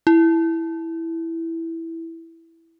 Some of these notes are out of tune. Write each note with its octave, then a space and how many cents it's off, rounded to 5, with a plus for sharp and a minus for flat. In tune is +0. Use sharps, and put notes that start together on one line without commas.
E4 +0